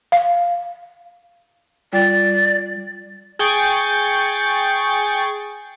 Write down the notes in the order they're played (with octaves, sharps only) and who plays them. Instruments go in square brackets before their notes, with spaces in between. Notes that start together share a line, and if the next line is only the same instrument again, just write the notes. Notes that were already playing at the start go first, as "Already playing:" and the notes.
[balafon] F5
[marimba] G3 F4 G5 [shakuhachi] D5
[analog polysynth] G#4 G5 C#6 A6